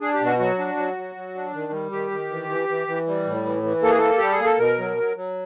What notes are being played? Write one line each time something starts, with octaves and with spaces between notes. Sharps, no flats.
D4 G#4
G4
B2
F#4
F#3 F#4
D4
F#3
F#3
F#3
D4
D#3
G3
D#3 G4
D#3
E3
E3
E3
E3
G3
A2
E3
E3
A#3 A4
G#4
A#3 A4
G3 G4
G#4
A#3
A4
B2 A#4
F#3
F#3
F#3